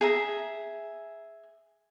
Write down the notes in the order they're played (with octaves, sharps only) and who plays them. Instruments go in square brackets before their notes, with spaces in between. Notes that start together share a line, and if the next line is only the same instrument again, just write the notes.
[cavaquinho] G#4 E5 A#5